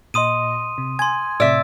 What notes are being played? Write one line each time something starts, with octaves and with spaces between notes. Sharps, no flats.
A#2 D#5 C6 D#6 D#7
C3
G#5 C6 G#6
A2 C3 D5 E5 E6